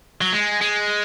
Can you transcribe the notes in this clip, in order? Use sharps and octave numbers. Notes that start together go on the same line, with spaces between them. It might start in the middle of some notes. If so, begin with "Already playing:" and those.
F#3
G#3
G#3